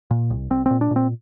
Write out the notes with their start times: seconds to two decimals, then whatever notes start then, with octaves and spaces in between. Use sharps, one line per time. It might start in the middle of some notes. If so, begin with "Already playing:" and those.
0.11 A#2
0.30 C2
0.50 C2 C4
0.66 A#2 C4
0.81 D4
0.91 A#2
0.96 C4